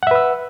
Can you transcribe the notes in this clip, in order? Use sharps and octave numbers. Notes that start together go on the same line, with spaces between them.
B4 E5 F#5 E6